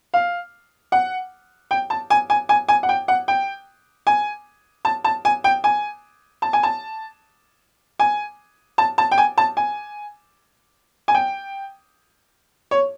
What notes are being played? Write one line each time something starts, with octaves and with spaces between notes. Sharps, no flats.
F5
F#5
G5
A5
G#5
G#5
G#5
G#5
F#5
G5
F#5
G5
G#5
A5
A5
G#5
G5
G#5
A5
G#5
A5
G#5
A5
A5
G5
G#5
A5
G#5
G#5
G5
C#5